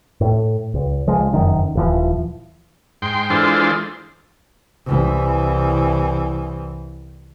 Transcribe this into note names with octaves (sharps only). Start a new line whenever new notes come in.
A2
C#2
C#2 F3 G#3
F1 F#2 D#3
D#1 E3 F3
G#2 G5 C6
E3 G#3 D4 F4 A4 C5
C2 E3